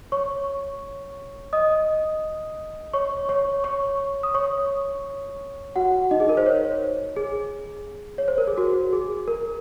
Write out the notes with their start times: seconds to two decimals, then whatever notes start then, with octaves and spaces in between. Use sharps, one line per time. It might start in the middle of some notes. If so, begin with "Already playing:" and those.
0.12 C#5 C#6
1.53 D#5 D#6
2.93 C#5 C#6
3.29 C#5 C#6
3.64 C#5 C#6
4.23 D#6
4.34 C#5 C#6
5.76 F#4 F#5
6.11 D#4 D#5
6.20 G#4
6.29 A#4
6.37 C5
6.46 C#5
7.17 G#4
8.18 C#5
8.28 C5
8.38 A#4
8.48 G#4
8.58 F#4
8.93 G#4
9.28 A#4